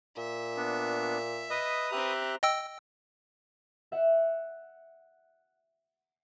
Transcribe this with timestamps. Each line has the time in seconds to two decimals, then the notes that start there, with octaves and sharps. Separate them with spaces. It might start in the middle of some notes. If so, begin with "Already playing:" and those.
0.17 A#2 E5
0.56 B3 D4
1.50 B4 D#5 D#6
1.92 C4 G4 E5 A#5 F#6
2.43 D#5 G5 E6
3.92 E5 F#5